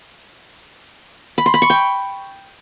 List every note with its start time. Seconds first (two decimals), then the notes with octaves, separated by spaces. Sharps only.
1.38 B5
1.46 C6
1.54 B5
1.62 C#6
1.70 G5